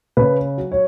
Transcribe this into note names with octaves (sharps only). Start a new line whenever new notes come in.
C#3 B4
F#3
C#5